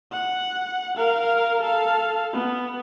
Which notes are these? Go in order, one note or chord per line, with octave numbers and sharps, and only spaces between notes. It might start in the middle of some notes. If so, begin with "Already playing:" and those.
F#5
A#4 F5
A4 F5
B3